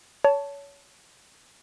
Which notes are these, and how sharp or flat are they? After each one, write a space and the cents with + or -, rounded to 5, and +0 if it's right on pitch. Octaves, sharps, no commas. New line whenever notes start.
C#5 +25 A5 +0